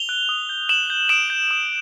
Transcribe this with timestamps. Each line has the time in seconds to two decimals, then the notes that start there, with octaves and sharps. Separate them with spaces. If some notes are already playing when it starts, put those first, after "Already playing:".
Already playing: F7 G7
0.09 F#6
0.29 D#6
0.49 G6
0.69 D#6 E7 F#7
0.90 G6
1.09 D#6 D7 E7
1.30 G6
1.51 D#6